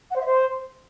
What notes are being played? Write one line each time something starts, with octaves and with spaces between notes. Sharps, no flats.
F#5
C5
E5
C5